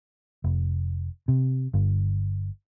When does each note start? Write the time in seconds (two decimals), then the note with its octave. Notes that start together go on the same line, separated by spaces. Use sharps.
0.44 F1
1.28 C3
1.74 G1